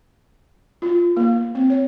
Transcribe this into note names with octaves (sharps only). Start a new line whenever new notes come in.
F4
A#3
C4
C#5